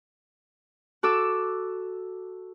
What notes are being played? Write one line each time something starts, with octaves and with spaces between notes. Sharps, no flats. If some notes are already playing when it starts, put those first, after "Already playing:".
F#4 A4 D6 E6